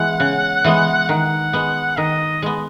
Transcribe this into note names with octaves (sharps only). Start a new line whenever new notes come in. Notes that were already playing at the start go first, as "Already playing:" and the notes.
Already playing: E3 G#3 B3 F#5
C#3
E3 G#3 B3
D#3 F#5
G#3 B3
D#3 D#5
G#3 B3